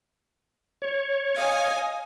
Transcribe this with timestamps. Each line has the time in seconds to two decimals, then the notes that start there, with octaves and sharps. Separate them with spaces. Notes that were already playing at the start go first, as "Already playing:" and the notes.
0.82 C#5
1.33 D#5 F5 G#5